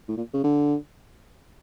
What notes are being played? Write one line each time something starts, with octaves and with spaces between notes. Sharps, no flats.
A2
A#2
C#3
D3